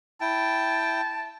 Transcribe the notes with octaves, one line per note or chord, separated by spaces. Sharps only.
E4 G5 A5